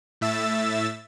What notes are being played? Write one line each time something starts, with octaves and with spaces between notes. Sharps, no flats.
A2 E5 E6 A6